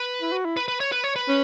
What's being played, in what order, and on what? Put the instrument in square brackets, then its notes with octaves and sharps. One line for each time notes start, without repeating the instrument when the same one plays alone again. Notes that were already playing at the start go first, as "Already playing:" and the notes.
Already playing: [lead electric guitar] B4
[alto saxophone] E4
F#4
E4
[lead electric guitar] B4
B4
C#5
B4
C#5
B4
[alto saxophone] C#4